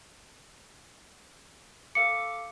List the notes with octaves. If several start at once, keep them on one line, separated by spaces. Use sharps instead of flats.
A4 F5 D6 C#7